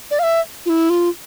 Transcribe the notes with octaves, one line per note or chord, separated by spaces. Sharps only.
D5
F5
E5
F4
E4
F4